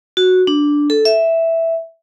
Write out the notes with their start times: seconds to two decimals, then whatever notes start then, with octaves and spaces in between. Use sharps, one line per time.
0.17 F#4
0.47 D4
0.90 A4
1.05 E5